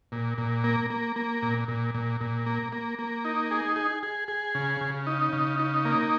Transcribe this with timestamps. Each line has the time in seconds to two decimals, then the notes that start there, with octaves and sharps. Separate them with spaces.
0.12 A#2
0.38 A#2
0.64 A#3
0.90 A#3
1.16 A#3
1.42 A#2
1.68 A#2
1.95 A#2
2.21 A#2
2.46 A#3
2.72 A#3
2.99 A#3
3.25 D#4
3.51 G#4
3.76 G#4
4.03 G#4
4.28 G#4
4.55 C#3
4.81 C#3
5.07 D#4
5.33 C#3
5.59 D#4
5.85 A#3